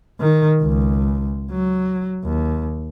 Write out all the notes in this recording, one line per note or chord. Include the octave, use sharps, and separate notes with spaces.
D#3
C#2
F#3
D#2